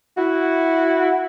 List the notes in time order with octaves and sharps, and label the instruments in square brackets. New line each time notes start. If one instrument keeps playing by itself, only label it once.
[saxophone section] E4 F#4